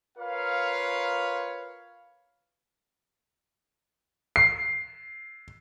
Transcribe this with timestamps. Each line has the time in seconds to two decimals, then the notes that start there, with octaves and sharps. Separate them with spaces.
0.18 F4 A#4 B4 C#5 F5
4.36 C7